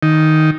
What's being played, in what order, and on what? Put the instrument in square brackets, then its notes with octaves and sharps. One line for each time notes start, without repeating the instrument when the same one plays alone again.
[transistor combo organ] D#3